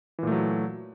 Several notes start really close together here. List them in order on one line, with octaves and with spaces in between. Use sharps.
E3 A#2 A3 F#3